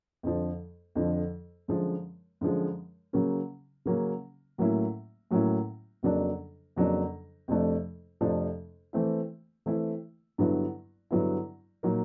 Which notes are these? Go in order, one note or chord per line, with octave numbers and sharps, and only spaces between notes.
F2 D3 F3
F2 D3 F3
F#2 D3 F3 G#3
F#2 D3 F3 G#3
C#3 F#3 A#3 C#4
C#3 F#3 A#3 C#4
A2 F#3 A#3 C#4 E4
A2 F#3 A#3 C#4 E4
F2 C#3 F#3 A#3 D4
F2 C#3 F#3 A#3 D4
F2 C3 F3 A3 D4
F2 C3 F3 A3 D4
E3 A3 C4 E4
E3 A3 C4 E4
G2 D3 F#3 B3 E4
G2 D3 F#3 B3 E4
A#2 F#3 A#3 D#4